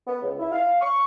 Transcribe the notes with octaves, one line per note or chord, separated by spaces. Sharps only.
B3
C#2
E4
F5
C#6